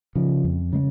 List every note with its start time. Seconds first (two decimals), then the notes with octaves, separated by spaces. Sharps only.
0.15 C#3 F3
0.44 F2
0.73 C#3 G#3